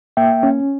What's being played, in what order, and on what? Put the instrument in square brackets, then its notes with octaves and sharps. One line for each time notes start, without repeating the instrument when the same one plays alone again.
[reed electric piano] A#3 E5 G5
C#4